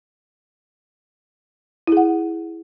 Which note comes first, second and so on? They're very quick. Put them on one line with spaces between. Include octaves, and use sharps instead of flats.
E4 G#4 F#5